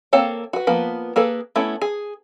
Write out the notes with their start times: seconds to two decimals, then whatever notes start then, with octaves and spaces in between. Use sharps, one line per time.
0.13 A#3 C4 A4 C#5 F5
0.53 F#4 B4
0.67 F3 A#3 B3 B4
1.16 A#3 G#4 A4 B4
1.56 A3 B3 C#4 E4
1.81 G#4